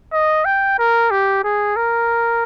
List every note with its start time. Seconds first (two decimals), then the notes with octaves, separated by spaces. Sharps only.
0.13 D#5
0.45 G5
0.78 A#4
1.11 G4
1.44 G#4
1.76 A#4